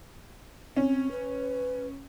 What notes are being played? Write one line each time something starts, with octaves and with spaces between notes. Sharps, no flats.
C4 C#4
B4